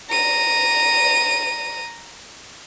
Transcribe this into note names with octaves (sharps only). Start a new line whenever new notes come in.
A#5 D#7